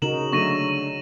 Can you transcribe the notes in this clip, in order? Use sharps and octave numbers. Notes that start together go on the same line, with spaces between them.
C#3 D#4 F#4 A#4 E7 F#7
D3 F#3 A3 C#6 A#6 D#7